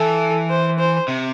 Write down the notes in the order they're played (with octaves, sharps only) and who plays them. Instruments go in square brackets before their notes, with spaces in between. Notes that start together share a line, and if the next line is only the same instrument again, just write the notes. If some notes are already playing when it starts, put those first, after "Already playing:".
Already playing: [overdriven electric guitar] E3 [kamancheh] A4
[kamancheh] C5
C5
[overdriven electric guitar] C3